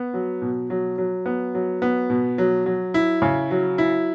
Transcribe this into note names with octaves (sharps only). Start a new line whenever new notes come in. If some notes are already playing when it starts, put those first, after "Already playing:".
Already playing: B3
F#3
B2
F#3
F#3
B3
F#3
B3
B2
F#3
F#3
E4
C#3
F#3
E4